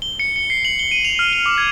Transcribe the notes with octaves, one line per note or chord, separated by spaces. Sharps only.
G7
C#7
C#7
C7
F#7
G7
D#7
F7
F6
G7
D6
G#6